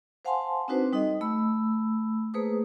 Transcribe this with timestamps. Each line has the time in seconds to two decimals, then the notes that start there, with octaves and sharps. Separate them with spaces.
0.25 C5 F5 F#5 G#5 A5 C6
0.68 C4 D4 D#4 F#4 B4 C5
0.93 G3 D#4 A4 D#5
1.21 A3 B5 E6
2.34 A3 A#3 G#4 B4 C5 D#6